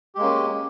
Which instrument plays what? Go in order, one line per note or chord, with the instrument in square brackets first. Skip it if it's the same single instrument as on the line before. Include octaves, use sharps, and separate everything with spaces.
[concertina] G4
G#3
A#3
C#4